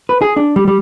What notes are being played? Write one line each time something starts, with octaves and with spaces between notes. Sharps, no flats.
B4
G#4
D4
G3
G3